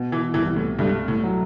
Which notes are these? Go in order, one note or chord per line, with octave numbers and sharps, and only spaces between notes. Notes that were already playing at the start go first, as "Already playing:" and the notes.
Already playing: B2
E3
C2 E3
A2
G2 A3
A2
F#3